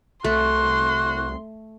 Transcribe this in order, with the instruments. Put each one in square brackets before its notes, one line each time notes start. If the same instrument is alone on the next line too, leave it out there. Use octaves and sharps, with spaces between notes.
[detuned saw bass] C2 [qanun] A3 [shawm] F#4 [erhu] C6